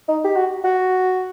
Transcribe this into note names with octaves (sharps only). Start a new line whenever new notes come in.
D#4
G4
F#4
F#4